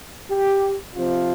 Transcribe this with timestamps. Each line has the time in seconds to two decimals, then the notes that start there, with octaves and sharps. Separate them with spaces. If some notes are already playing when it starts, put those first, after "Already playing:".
0.30 G4
0.94 C3 F3 C4 F4